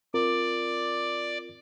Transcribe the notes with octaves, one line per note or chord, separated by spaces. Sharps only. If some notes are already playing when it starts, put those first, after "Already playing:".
C4 F4 A#4 D5